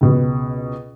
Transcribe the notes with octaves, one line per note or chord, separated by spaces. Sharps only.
C#2 B2